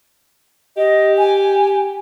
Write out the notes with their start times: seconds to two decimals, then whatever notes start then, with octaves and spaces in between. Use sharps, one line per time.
0.77 G4 D#5
1.18 G#5